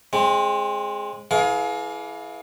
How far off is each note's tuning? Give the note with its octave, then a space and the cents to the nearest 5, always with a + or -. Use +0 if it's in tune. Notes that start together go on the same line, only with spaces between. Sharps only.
G#3 +0 C4 +30
E3 +0 G#4 +35 F5 +30